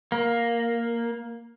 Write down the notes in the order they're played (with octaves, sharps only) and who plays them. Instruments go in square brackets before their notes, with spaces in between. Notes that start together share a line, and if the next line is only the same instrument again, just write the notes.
[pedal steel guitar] A#3